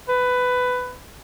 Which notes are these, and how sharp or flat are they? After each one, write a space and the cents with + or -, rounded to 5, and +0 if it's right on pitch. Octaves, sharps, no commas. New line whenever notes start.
B4 +15